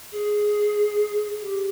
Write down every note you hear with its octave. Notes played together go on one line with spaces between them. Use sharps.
G#4
G4